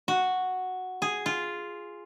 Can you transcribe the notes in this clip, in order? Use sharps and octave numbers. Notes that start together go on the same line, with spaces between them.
F#4
G#4
F4